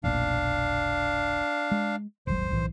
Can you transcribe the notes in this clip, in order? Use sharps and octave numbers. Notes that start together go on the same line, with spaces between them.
F1 B1 A#2 D4 F5
G#3
D#1 G#1 F#3 C5
B1 A2 E3